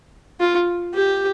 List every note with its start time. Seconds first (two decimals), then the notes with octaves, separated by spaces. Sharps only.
0.40 F4
0.94 G4